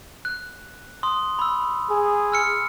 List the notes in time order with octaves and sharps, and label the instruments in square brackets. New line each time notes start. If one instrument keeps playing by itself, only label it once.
[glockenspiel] F#6
C6 D#6
B5 E6
[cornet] G#4
[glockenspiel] E6 F6 C#7